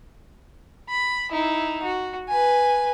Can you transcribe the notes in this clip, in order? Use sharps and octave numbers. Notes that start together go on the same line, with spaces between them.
B5
D#4 E4
F#4
B4 G#5